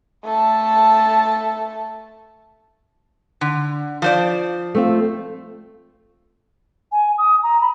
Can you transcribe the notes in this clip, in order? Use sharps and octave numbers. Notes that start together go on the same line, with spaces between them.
A3 A5
D3
F3 C5 D5
A3 C4 F4
G#5
D#6
A#5
B5